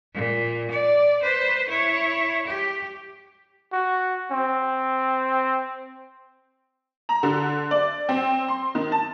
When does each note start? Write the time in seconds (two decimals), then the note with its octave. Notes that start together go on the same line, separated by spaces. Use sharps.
0.14 A#2
0.71 D5
1.22 B4 C5
1.69 E4 C#5
2.46 G4
3.73 F#4
4.31 C4
7.09 A#5
7.23 D3
7.71 D5
8.09 C4
8.48 C6
8.75 D#3
8.92 A5